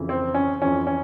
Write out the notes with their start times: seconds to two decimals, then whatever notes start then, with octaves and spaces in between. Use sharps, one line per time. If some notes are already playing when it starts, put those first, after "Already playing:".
Already playing: F2 C#3 E3
0.09 C4
0.34 C#4
0.61 F2 E3 C#4
0.87 C#4